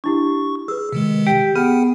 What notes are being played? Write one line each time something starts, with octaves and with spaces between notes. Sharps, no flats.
D4 E4 G4 C#6
G#4 B4 E6
C3 D#3 G#3
G4 G5 B6 D7
B3 G#4 F#5 G5 F6